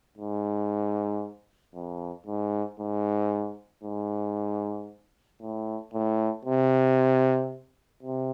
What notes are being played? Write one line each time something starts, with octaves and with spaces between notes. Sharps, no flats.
G#2
F2
G#2
G#2
G#2
A2
A2
C3
C3